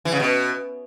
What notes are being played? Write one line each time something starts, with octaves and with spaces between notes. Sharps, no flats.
E3
C#3
B2